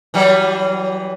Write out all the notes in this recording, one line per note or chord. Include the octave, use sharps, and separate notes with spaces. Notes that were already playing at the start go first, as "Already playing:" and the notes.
E3 F#3 G3